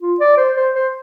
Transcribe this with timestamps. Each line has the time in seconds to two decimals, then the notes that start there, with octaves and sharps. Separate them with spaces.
0.01 F4
0.20 D5
0.38 C5
0.57 C5
0.75 C5